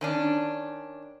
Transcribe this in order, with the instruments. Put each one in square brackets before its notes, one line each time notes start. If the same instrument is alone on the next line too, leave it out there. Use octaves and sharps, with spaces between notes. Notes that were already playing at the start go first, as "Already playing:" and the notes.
[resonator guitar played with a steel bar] D#3 C#4 D4